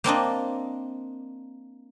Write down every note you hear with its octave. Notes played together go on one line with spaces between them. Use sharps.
A#3 C4 D4 D#5